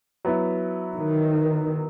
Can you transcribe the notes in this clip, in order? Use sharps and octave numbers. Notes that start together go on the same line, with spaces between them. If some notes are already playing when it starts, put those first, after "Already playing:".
F#3 B3 E4
D#3